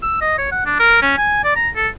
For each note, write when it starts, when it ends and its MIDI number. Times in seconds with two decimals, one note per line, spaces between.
0.03 0.19 88
0.21 0.38 75
0.38 0.51 73
0.51 0.64 78
0.66 0.78 62
0.79 0.99 70
1.02 1.15 61
1.17 1.40 80
1.44 1.55 74
1.56 1.69 82
1.76 1.88 69